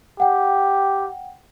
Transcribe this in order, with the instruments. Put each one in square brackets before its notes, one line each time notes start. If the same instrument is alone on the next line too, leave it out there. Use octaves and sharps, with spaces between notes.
[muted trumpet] G4 [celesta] F#5 G5